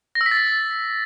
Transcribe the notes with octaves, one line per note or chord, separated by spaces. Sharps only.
A#6
E6
B6
A6
B6